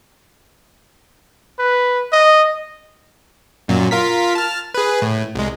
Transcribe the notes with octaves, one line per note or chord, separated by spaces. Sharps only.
B4
D#5
F#2 A#2 F#3
F4 A#4 B6
A5 F6
G#4 B4
A2
C2 G#3